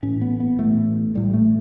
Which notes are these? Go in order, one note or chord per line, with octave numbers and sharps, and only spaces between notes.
A1 A2 C#4
B3
B3
A1 A2 A3
A1 A2 G3
A3